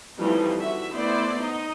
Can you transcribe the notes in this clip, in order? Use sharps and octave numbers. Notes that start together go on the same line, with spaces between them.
E3 F3 G3 A3 C4 D#4
D3 F#4 E5
A3 B3 E4 C5 D5
D#4 D#5